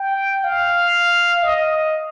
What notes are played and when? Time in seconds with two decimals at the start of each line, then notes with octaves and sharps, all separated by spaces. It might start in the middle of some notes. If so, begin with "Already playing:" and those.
Already playing: G5
0.44 F5
1.43 D#5